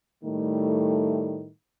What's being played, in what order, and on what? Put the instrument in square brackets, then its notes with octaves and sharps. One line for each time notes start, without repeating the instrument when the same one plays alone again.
[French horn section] A2 D#3 G3 A3